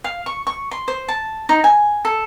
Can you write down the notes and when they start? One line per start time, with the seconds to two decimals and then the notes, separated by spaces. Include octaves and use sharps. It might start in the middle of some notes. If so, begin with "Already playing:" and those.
0.04 F5
0.26 C#6
0.47 C#6
0.71 C6
0.88 C5
1.08 A5
1.49 D#4
1.64 G#5
2.05 A4